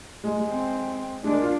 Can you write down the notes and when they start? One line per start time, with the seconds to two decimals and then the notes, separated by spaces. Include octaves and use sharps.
0.24 G#3
0.36 G#3
0.49 C4
1.24 G#3 D4
1.33 A#3
1.43 F4